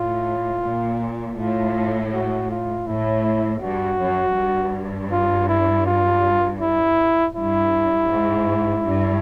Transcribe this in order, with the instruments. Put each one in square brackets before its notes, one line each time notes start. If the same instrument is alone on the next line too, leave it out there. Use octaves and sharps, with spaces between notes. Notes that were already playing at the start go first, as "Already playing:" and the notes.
Already playing: [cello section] A2 [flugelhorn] F4
[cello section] A#2
[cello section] A2 [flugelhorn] F4
[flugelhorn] F#4
F4
[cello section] A2 [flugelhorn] E4
[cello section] G2 [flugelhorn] F#4
[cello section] F#2
G2
[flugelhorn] F4
E4
F4
E4
[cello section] G2 [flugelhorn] E4
[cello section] G#2
G2